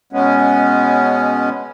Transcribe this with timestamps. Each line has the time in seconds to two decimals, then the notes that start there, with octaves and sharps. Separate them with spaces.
0.13 B2 G#3 B3 C#4